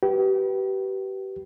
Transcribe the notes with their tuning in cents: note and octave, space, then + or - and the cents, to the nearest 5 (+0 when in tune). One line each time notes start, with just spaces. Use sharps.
G4 -30 B4 -15